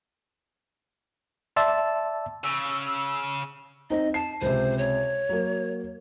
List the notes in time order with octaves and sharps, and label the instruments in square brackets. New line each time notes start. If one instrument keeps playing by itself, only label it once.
[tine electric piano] D5 E5 A5 C6 E6
[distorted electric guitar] C#3 [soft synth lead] E6
[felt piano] C4 D#4 [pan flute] D#5
[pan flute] A5 [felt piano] C7
[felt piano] C#2 C3 [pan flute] C5
[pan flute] C#5
[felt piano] F#3 A#3